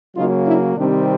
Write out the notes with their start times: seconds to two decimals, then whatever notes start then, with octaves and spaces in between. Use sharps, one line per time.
0.16 C#3 F#3 A#3 D#4 F4
0.46 D4 E4
0.77 C3 D#3 G3 C4 D4